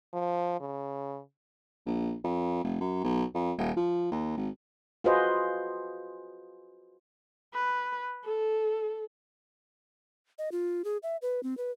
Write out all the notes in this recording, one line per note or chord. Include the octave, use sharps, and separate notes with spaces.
F3
C#3
A#1
F2
F1
F#2
B1
F2
D#1
F3
D#2
G#1
F4 F#4 G#4 B4 C5 D#5
B4
A4
D#5
F4
G#4
E5
B4
C4
B4